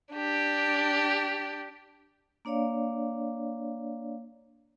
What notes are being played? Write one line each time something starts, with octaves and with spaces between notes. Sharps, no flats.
D4 G4
A#3 D4 C#5 D5 F5